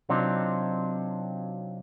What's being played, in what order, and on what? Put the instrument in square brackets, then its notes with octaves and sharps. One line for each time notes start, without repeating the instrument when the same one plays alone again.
[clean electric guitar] C3 F#3 C4 D4 D#4 F4